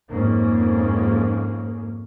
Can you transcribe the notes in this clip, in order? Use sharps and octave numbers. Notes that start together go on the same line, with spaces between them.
F2 G#2 A#3 C#4